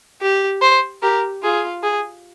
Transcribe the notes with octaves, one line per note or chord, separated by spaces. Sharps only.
G4
C5
G4 A#4
F4 G#4
G#4